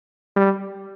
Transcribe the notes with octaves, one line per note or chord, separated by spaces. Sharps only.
G3